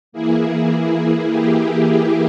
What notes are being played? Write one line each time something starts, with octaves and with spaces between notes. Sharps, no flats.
E3 A#3 E4 G#4
G4